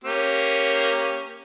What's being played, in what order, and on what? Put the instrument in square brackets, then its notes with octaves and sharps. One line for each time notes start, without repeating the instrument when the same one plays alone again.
[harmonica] A#3 C#4 G4